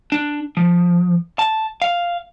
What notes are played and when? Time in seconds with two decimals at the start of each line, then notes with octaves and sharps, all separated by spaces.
0.12 D4
0.57 F3
1.39 A5
1.82 F5